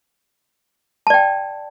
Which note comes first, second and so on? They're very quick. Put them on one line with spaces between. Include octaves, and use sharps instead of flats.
A5 D5 G5